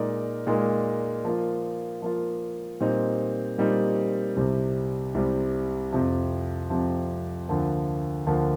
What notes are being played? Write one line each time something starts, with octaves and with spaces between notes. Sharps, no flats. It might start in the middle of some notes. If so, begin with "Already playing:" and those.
Already playing: A#2 G#3 D#4 A#4 D5
A#2 G#3 D#4 A#4 D5
F3 A#3 F4
F3 A#3 F4
A#2 G3 C4 D#4
A#2 G3 C4 D#4
C2 C3 G3 C4
C2 C3 G3 C4
F2 C3 F3
F2 C3 F3
D2 D3 F3 A#3
D2 D3 F3 A#3